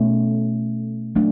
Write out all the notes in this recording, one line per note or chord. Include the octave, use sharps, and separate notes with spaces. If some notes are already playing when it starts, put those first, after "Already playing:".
Already playing: B2 A3 C#4
F#3 A3 D4